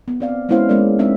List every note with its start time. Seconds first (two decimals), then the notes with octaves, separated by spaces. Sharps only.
0.08 B3
0.20 C4 D5 F5
0.49 G#3 B3 C#4 E4 C5 F5
0.69 G#3 A#3 B3 C#4 A#4 D5
0.99 G#3 C4 C#4 D#4 E5